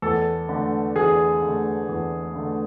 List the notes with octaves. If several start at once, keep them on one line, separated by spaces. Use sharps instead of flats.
E2 A4
D3 A3
E2 G#4
D3 A3
E2
D3 A3